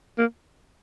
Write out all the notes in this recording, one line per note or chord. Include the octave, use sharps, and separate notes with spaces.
A#3